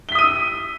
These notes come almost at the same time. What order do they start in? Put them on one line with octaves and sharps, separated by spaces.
G7 B6 D#6 D#7 E6